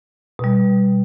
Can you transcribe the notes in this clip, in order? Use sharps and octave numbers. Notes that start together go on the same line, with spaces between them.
B2 G3